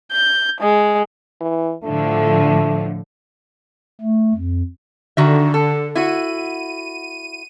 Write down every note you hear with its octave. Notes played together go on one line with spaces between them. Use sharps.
G6
G#3
E3
A2 D3 F3 A3
A3
F2
D3 D#3 F#4 E5
A4
E4 F#4 D#7